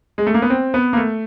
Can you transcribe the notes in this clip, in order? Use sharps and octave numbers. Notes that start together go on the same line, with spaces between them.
G#3
A3
A#3
B3
C4
B3
A#3
A3